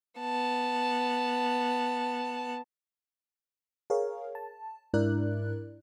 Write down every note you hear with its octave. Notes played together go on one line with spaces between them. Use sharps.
B3 A5
G#4 A#4 C#5 F5
A5
G#2 D4 E4 A#4 D5 F#6